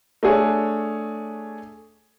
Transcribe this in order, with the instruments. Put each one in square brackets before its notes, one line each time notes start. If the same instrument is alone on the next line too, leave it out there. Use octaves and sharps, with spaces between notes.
[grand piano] A3 D4 G#4 C#5